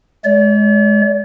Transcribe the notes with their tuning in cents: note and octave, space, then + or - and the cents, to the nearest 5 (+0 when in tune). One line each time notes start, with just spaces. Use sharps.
G#3 +20 D5 -45